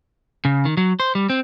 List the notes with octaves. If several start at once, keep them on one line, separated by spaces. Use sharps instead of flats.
C#3
D#3
F#3
C5
G3
C4